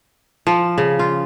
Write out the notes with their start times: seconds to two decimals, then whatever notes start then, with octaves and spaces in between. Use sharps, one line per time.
0.47 F3
0.78 C#3
0.99 F4